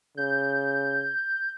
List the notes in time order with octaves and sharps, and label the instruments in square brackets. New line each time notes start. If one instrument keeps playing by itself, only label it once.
[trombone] C#3 [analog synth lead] G6